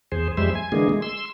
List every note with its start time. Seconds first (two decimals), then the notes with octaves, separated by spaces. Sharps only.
0.12 E2 G#4 C5
0.37 F2 G3 G#3 C5 E5
0.55 G#5
0.72 D3 E3 G#3 A#3 G#4
0.89 G#3
1.02 C6 E6